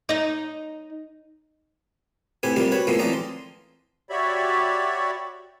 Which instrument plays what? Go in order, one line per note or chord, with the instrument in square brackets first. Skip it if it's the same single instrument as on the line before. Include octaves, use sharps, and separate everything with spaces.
[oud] D#4 D#5
[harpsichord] A2 C4 G4 B4 G#5
C3 G3 A#3 C4 F4 G4
F#4 B4 C#5
A2 F3 G#3 A#3 B3
E3 F3 C4 D5 A#5 D#6
C6
[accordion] F#4 G4 C#5 D5 E5 B5